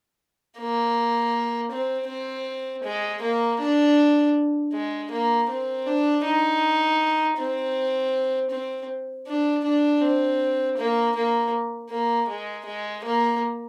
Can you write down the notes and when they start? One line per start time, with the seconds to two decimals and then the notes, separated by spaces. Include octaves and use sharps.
0.58 A#3
1.72 C4
2.08 C4
2.84 G#3
3.22 A#3
3.60 D4
4.73 G#3
5.11 A#3
5.49 C4
5.87 D4
6.25 D#4
7.37 C4
8.50 C4
9.26 D4
9.64 D4
10.01 C4
10.77 A#3
11.16 A#3
11.90 A#3
12.28 G#3
12.66 G#3
13.04 A#3